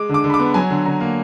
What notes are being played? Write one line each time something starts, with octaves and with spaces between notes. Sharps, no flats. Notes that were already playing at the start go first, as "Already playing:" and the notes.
Already playing: G#3 D6
D3
D6
D3
B5
D6
B3
F#3 G#5
D3
D3 A#5
A#3